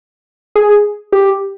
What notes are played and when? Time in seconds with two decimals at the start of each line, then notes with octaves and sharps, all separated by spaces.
0.55 G#4
1.13 G4